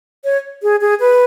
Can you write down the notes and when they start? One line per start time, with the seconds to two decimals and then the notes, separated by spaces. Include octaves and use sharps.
0.24 C#5
0.63 G#4
0.81 G#4
1.00 B4